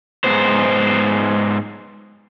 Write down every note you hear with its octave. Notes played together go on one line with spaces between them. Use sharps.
G#2 B3 C5